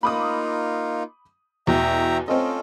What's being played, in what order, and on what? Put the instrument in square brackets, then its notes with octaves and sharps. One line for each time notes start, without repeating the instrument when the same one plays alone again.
[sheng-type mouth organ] A#3 D#4 F4 [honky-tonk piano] B5 D6 D#6
[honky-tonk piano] E2 B2 [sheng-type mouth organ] E5 G5 A#5
[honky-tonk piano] C4 D#5 [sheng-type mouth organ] C#4 F4 A4